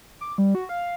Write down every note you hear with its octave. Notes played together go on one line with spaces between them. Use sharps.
D6
G3
F#4
F5